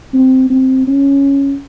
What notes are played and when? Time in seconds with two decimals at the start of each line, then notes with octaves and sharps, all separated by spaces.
0.13 C4
0.50 C4
0.87 C#4